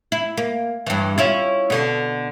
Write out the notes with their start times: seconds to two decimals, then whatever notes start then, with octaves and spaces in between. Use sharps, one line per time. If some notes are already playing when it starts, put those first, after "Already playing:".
0.12 E4
0.38 A#3
0.87 G2 E3
1.18 C#4 E4 F4
1.70 B2 D3